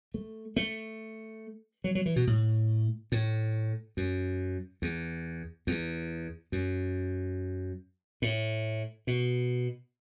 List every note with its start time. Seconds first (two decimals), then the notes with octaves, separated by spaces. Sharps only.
0.14 A3
0.56 A3
1.84 F#3
1.95 F#3
2.06 E3
2.16 B2
2.27 A2
3.12 A2
3.97 F#2
4.82 E2
5.67 E2
6.52 F#2
8.22 A2
9.07 B2